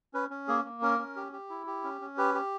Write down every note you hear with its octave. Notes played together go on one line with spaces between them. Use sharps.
C#4 B4
C#4
A#3 G#4
A#3
C#4 A#4
C#4
G4
G4
E4
G4
C#4
C#4
G4 B4
G4